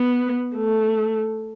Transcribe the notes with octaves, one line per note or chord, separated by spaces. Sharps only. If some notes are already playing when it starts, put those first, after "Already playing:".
Already playing: B3
A3